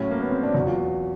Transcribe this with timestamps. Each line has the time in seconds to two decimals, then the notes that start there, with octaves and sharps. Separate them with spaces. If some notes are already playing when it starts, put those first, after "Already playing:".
Already playing: A2 F#3 C#4
0.11 A#3
0.20 B3
0.31 C4
0.43 D4
0.54 E2 B2 F#3 F#4
0.67 F4